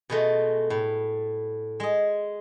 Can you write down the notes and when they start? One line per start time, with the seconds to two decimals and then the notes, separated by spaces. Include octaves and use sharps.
0.10 B2 G#3 A3
0.70 A2
1.80 G#3 G#4